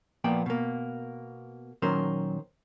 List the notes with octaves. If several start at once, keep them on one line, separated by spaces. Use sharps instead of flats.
A#2 F3 A#3 B3 D5 G5
B2 A#3
A#2 D#3 F#3 C#4 A#4 C5